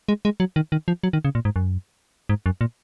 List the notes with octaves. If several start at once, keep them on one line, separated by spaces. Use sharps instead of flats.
G#3
G#3
F#3
D#3
D#3
F3
F#3
D#3
C#3
A#2
G#2
F#2
G#2
F#2
A#2